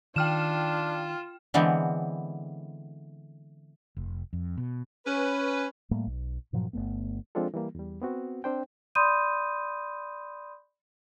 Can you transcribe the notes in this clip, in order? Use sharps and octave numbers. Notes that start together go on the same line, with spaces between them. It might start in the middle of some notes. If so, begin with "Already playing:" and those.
D#3 D4 F4 G5 F6 E7
D3 E3 G#3 B3 C4
F1
F2
B2
C#4 B4
A2 G3 A3 A#3
B1
G2 A#2 F3 F#3
G1 D#2 A3 B3
F3 G#3 C4 D4 F4 A4
E3 G3 A#3
E2 G3
B3 C4 F#4
C4 D4 C5 G5
D5 B5 C6 D#6 G6 D#7